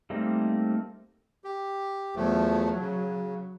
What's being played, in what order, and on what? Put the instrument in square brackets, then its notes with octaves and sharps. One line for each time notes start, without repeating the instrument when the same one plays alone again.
[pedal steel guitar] G3 A3 A#3 C4 D#4
[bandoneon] G4
[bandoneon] E2 F3 A3 [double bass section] F#3
[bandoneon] C#3